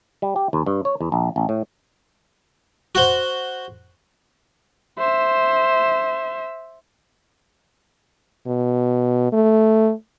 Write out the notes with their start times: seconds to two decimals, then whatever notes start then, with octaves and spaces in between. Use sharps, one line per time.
0.22 G3
0.36 G4
0.53 D#2
0.66 G2
0.85 C#5
1.01 E2
1.12 A#1
1.36 A1
1.49 A2
2.95 F#4 C5
4.98 C5 E5
8.47 B2
9.33 A3